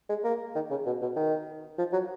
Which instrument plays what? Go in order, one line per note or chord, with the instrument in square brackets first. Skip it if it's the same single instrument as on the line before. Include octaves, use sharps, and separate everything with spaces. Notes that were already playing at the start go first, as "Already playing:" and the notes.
[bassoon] G#3
A#3
D#3
C#3
B2
B2
D#3
F3
F#3